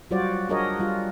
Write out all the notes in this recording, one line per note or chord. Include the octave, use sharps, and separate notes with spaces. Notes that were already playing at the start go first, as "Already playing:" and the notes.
F#3 G3 F4 F#4 C5 D5
D4 F#4 G#4 A#4 C#5 D#5
G3 F4